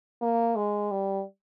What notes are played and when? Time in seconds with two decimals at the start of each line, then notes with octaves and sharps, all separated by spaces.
0.22 A#3
0.56 G#3
0.91 G3